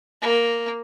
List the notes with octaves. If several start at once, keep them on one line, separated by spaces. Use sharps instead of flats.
A#3